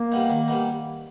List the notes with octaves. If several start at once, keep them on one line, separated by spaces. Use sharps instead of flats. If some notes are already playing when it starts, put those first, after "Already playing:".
Already playing: A#3
G3 B3 D#4
D#3
G3 B3 D#4